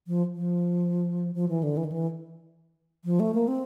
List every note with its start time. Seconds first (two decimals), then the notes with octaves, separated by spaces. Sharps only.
0.07 F3
0.35 F3
1.35 F3
1.49 E3
1.63 D3
1.77 E3
1.85 D#3
1.92 E3
3.05 F3
3.20 A3
3.34 A#3
3.48 C4